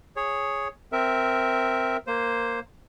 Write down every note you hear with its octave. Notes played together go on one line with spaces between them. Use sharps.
G#4 C#5
C4 A#4 E5
A#3 C5